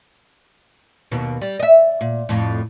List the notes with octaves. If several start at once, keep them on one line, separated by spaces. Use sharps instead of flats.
D#2 B2
G3
D#5 E5
A#2
F2 A2